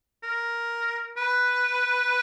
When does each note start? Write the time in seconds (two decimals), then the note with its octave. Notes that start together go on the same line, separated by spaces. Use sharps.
0.23 A#4
1.17 B4